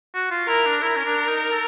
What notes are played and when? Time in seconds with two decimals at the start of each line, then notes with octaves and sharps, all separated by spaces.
0.14 F#4
0.31 F4
0.48 E4 A#4
0.66 D4
0.82 E4 A#4
0.96 C#4
1.05 D4
1.28 D#4
1.51 A4